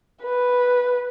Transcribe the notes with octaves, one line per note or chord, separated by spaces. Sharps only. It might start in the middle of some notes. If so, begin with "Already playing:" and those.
B4